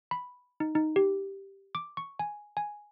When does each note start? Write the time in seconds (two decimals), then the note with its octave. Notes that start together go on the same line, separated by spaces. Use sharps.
0.11 B5
0.60 D#4
0.75 D#4
0.96 G4
1.75 D6
1.97 C#6
2.19 G#5
2.57 G#5